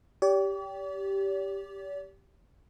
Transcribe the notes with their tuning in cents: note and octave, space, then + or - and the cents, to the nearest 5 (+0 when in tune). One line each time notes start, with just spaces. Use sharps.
G4 +0 D5 -45